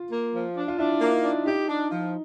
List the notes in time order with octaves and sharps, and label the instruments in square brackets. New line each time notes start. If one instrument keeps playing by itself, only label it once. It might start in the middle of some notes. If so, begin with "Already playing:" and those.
Already playing: [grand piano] F4
[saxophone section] A#3
F3
D4
[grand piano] F4
[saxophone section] D4 [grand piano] E4
[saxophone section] A#3
[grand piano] D#4
[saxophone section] D4
[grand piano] D#4 [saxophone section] G4
[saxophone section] D4
F3